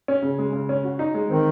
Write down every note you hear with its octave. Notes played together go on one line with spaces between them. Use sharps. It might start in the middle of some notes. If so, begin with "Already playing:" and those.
C#4
C#3
G#3
C#3
C#4
F#4
D#4
G#3
D#3 C4